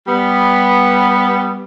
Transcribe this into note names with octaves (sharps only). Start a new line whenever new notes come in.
G3 B3